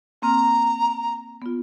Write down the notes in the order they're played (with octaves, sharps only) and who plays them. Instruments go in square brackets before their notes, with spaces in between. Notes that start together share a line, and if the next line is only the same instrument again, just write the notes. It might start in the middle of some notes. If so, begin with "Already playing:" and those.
[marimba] A#3 C4 F6 [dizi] A#5
[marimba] B3 F4